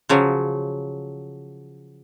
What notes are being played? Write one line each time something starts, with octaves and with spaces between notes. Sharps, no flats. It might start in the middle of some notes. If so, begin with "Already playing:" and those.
C#3 F3 F#3